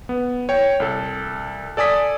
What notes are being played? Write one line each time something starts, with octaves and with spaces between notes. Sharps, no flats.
B3
C#5 G5
C2 A4
A4 D5 G#5 D#6 B6